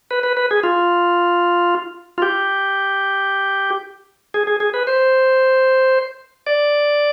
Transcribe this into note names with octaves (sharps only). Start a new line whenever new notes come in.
B4
B4
B4
G#4
F4
F4
G4
G#4
G#4
G#4
B4
C5
D5